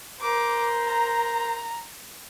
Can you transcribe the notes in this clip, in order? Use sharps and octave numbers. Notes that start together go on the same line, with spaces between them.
A#4 C5 D6
A#5